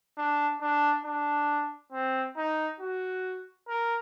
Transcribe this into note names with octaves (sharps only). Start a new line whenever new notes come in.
D4
D4
D4
C4
D#4
F#4
A#4